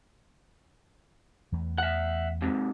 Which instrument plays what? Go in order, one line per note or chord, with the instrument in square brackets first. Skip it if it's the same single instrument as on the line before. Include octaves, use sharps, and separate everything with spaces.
[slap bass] E2 E3 A3
[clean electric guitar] E5 F#5
G#2 C3